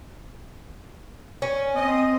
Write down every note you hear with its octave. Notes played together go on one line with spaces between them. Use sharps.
C#4
C4 D#5